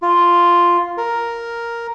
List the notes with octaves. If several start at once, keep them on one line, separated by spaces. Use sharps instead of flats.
F4
A#4